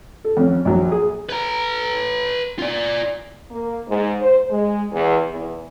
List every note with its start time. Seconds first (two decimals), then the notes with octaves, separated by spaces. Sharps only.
0.25 A4
0.37 F2 C#4
0.65 A#1 F#3
0.92 G#4
1.29 B4 A#5
2.59 F4 D5
3.50 A#3
3.88 G#2
4.20 C5
4.50 G#3
4.92 E2
5.31 E2